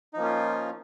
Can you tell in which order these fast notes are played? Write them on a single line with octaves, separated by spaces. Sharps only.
D#4 F3 A#3 C#4 F4